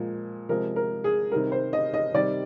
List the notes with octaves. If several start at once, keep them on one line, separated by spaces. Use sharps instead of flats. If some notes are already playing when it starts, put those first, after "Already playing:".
Already playing: A#2 F3 G#3
C3 F3 G#3 A#4
A#4
G#4
C3 D#3 G3 A#4
C5
D#5
D#5
C3 D#3 G3 D5